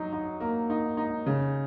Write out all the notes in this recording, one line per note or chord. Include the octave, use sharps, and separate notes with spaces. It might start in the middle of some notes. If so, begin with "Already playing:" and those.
Already playing: F#3 D#4
D#4
A#3
D#4
D#4
C#3